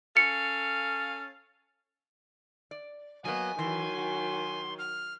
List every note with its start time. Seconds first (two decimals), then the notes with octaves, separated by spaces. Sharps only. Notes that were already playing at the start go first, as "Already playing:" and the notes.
0.17 C#4 A4 F5 C#7
2.71 D5
3.25 F#3 A#3 B3 D#5 G#5
3.59 D#3 E3 F#3 C6
3.98 F#4
4.79 F6